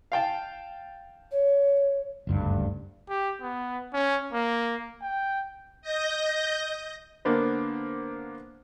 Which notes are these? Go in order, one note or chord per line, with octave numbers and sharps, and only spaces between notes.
F5 G5 A5
C#5
F#1 D2 G2
G4
B3
C#4
A#3
G5
D#5 G6 A#6
D3 A#3 B3 D4 C5